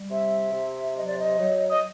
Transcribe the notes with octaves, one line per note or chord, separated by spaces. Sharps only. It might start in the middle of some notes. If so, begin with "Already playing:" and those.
Already playing: G3
C3 E5
C3
F#3 D#5
D5
D#5
F#3
D#5